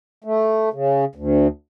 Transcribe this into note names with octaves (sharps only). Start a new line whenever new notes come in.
A3
C#3
D2